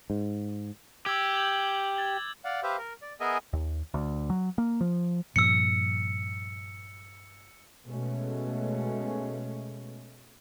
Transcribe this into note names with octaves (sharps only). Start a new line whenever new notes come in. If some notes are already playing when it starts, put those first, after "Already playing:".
G#2
G4 D6 E6 G#6
G6 G#6 F#7
G#6 A6 G7
D5 F5 F#5
G4 B4 C5 E5 F5
A#4
D5
B3 G#4 A#4 D#5 E5 G#5
D#2
D2
F#3
A#3
F3
G2 A#2 F3 E6 C#7
B2 G#3 A3 C#4